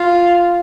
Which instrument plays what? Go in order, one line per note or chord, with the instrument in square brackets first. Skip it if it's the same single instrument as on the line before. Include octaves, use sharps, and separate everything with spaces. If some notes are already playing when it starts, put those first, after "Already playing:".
Already playing: [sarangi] F4